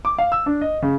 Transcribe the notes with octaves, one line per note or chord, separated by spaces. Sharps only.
D6
F5
E6
D4
D#5
C#3